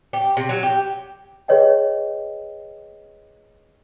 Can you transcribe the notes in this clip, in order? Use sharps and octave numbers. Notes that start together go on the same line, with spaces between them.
G4
C3
F#3
G4
G#4 B4 C#5 D#5 G5